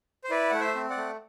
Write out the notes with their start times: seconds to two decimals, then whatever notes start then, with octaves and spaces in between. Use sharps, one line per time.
0.24 C5
0.30 E4 B4 D5
0.50 A3 F#5
0.60 C5 E5
0.75 C4
0.90 D5 F#5
0.97 A3